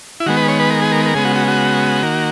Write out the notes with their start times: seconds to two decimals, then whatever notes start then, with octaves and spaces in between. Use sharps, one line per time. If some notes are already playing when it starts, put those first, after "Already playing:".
0.20 E4
0.26 D#3 G#3 B3 F#4
0.37 B4
0.48 C#5
0.60 B4
0.70 A#4
0.82 G#4
0.92 A#4
1.06 A#4
1.14 C#3 G#3 B3 G#4
1.25 F#4
1.36 F#4
1.48 F#4
2.03 D#3 A#3